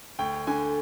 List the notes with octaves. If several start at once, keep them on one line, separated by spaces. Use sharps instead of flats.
D2 G5
D3 G#5